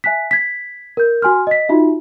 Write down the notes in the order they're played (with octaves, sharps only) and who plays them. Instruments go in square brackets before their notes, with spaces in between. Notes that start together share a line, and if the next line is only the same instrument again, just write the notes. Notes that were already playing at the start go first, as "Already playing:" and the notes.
[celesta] E5 G#5 F#6 B6
G#6 B6
A#4 G6
F#4 G#5 C6 F6
D#5 B6
D#4 F4 F#4 E5